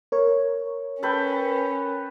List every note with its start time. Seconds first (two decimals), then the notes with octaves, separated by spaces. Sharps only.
0.12 A#4 C#5
1.03 C#4 A4 B4 G5